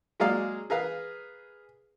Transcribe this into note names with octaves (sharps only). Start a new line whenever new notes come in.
F#3 G#3 A#3 G#4 D5 F5
G#4 A#4 B4 F5